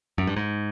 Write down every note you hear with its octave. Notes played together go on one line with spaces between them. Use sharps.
F#2
G2
G#2